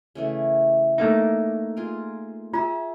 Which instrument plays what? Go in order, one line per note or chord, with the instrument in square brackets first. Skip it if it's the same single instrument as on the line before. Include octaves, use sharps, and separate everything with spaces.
[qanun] C#3 E3 A3
[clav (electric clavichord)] A3 A#3 D#4 [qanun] D6
[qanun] F4 G#4 A#4
[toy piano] F4 [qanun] G#4 E5